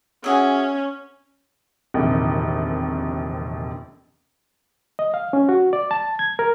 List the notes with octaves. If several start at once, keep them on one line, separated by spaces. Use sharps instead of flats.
C#4 F#4 G#4 E5
E1 A#1 F2 C3 D#3
D#5
F5
C#4
F#4
D5
A5
G#6
A#4